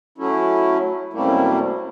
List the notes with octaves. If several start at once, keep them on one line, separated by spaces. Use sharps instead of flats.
F#3 A3 C#4 E4
F#2 C3 G3 A3 A#3 E4